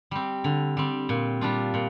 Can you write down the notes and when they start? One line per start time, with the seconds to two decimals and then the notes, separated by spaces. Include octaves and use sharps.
0.11 G3 C4
0.44 D3
0.77 G3 C4
1.09 A#2
1.41 G3 D4 F4
1.74 A#2